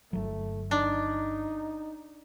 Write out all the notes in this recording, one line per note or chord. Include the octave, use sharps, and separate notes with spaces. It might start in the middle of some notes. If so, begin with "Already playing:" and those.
G1 F#3 A3
D4 D#4